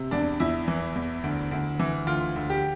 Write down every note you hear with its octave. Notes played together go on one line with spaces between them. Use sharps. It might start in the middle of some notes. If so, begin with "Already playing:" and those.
Already playing: C3
E2 D4
E2 E4
E3
E2
D2
D2
E3
D2 F4
D2
G4